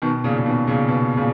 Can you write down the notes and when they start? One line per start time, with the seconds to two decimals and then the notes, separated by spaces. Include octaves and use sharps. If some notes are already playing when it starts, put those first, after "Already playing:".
0.02 B2 D#3
0.24 A#2 C#3
0.38 C#3
0.45 B2 D#3
0.67 A#2 C#3
0.89 B2
1.17 A#2 C#3